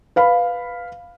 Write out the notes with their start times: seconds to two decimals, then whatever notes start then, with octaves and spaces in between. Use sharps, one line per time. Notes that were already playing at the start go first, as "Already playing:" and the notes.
0.16 B4 F5 B5